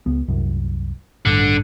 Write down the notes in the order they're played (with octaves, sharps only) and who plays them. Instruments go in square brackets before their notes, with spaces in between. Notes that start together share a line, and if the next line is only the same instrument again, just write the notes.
[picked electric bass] C#2 B3
C2 F#2
[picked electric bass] A1 G2 [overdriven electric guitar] D3